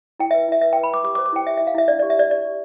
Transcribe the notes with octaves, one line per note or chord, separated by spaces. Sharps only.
E4 G5
B4 E5
E4 E5
B4 E5
B4 G5
B5
B4 D6
G4 D6
D6
C5
D6
E4 G5
G4 E5
E4 E5
F5
E4 E5
D4 D5
G4 D5
E5
G4 D5
G4 D5
G4